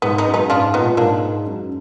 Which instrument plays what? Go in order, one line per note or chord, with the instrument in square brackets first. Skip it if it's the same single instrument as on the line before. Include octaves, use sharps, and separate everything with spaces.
[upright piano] G#2 [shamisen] B3
[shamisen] B3 D#4
[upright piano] F#2
[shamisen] B3 D#4
[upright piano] G#2 [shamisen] D4 F4
[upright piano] A#2 [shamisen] B3 D#4
[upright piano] A#2
[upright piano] G#2 [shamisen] A#3 D4
[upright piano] F#2